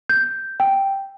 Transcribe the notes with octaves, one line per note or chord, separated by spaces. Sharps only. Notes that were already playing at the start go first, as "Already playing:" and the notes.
G6
G5